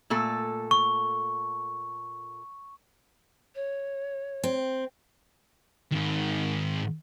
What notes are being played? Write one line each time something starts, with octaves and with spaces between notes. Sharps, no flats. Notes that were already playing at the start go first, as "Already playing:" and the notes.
A#2 A3 A4
C#6
C#5
C4
G#2 D#3